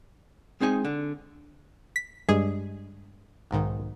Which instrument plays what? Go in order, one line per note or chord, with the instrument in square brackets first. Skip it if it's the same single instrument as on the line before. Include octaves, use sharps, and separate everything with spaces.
[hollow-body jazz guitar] G#3 C4 D#4 G#5
D3
[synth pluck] B6
[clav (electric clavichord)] G2 G#3 [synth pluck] G#4
[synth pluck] B1 G#2 D#3